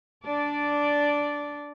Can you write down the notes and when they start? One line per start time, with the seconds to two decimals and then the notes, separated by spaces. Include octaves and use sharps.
0.24 D4 D5